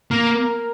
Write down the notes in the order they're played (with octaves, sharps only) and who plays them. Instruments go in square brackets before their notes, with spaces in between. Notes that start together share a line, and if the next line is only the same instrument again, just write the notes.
[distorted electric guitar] A#3 [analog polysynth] A#4